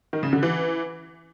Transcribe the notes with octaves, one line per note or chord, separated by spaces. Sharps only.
D#3
C#3
D3
E3